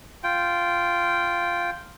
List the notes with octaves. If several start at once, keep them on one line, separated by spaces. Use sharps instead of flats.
F4 G5